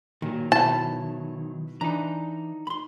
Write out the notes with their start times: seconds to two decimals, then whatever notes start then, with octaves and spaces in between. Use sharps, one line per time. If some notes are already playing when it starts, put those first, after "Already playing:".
0.22 A#2 D#3 F#3
0.52 B2 E4 A5
1.81 E3 D4 D#4 A#5
2.67 B5 C6